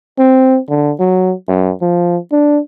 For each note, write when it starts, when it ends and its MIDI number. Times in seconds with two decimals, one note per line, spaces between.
0.19 0.59 60
0.69 0.92 50
1.00 1.33 54
1.48 1.72 42
1.82 2.17 53
2.32 2.59 62